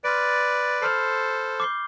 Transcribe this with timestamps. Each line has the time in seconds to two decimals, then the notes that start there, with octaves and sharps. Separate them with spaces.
0.04 B4 D5 C6 F6 A6 D7
0.82 A4 C5 B5 F6 C7
1.60 D6 G6 C7 G7